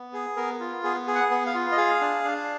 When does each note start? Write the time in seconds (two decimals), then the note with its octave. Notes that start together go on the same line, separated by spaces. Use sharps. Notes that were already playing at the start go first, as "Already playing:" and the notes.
Already playing: B3
0.13 G#4
0.36 B3 A#4
0.60 F4
0.83 B3 G#4
1.07 G#4
1.15 F#5
1.30 B3
1.46 F5
1.54 F4
1.72 D#5
1.77 G#4 F5
2.01 D4
2.24 D4